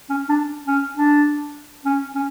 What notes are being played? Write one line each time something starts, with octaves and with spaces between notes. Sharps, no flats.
C#4
D4
C#4
D4
C#4
C#4